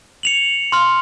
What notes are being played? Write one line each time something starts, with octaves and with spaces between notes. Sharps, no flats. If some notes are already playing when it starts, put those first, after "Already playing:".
C#7 F7 F#7
C6 F6